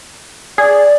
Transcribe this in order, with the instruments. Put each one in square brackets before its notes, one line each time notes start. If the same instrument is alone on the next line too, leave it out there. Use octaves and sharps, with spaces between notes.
[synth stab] G#4 [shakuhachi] D5